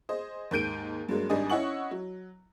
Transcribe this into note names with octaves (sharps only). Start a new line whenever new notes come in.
G#4 C5 D#5
D#2 G#2 A#4 G6 D7 D#7
G2 F#3 G#3 A#3
G#1 G#2 G3 D4 D#5 G#5
C#4 E4 D#5 F#5 C#6 F#7
F#3